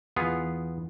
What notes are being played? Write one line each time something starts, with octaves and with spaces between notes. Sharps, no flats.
E2 E3 B3 F4 G#4